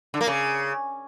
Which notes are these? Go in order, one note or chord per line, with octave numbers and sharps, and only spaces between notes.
D3
A#3
C#3